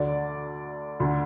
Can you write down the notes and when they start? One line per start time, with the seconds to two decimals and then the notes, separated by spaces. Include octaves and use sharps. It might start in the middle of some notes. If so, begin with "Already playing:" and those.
Already playing: D2 D3 D5
1.00 D2 D3